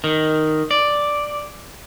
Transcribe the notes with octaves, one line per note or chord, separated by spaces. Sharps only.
D#3
D5